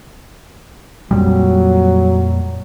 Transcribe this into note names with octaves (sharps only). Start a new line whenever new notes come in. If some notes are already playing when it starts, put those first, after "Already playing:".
F2 A#2 F#3 G3